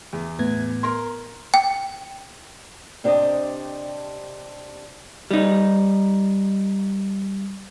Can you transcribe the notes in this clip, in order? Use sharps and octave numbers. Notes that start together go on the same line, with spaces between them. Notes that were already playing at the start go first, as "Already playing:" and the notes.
E2
A2 B3 G#6
A#4 A#5 C6
G5
C3 D4 G4 C5 D#5
G3 D#4